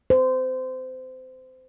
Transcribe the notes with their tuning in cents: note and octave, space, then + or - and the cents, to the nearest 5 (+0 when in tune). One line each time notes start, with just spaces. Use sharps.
C5 -25